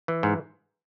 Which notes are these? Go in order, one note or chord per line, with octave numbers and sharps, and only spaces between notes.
E3
G#2